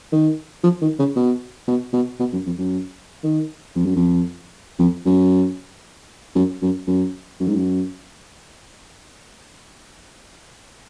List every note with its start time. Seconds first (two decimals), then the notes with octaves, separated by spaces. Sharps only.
0.12 D#3
0.64 F3
0.82 D#3
0.99 C#3
1.16 B2
1.68 B2
1.93 B2
2.19 B2
2.33 F#2
2.46 F2
2.58 F#2
3.24 D#3
3.75 F2
3.85 F#2
3.96 F2
4.79 F2
5.05 F#2
6.35 F#2
6.62 F#2
6.87 F#2
7.40 F#2
7.47 G#2
7.54 F#2